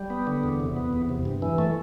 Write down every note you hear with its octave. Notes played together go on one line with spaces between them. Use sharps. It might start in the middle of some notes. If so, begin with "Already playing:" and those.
Already playing: G3
B3
D3
E2
C3
B3
E2
C3
G2
E3
A3